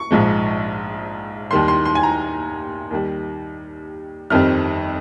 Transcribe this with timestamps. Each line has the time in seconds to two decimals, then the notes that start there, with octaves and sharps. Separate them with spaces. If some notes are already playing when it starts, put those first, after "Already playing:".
Already playing: C#6
0.11 A#1 G#2 F3 G#3
1.51 D#2 D#3 G3 C6
1.68 C6
1.86 C6
1.95 G#5
2.03 A#5
2.91 D#2 D#3 G3
4.30 G1 F2 D#3 G3 C4 F6